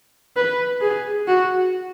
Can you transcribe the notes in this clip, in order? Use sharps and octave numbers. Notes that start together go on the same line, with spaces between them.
B4
G#4
F#4